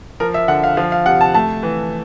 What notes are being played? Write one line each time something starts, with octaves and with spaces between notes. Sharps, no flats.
F3 A#4
E5
D3 F#5
F5
F3 F5
F5
C3 F#5
A5
A3 A5
E3